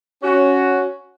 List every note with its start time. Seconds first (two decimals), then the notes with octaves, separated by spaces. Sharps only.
0.23 C#4 F#4